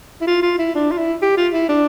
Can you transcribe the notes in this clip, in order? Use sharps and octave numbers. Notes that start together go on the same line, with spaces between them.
E4
F4
F4
E4
D4
F4
E4
G4
F4
E4
D4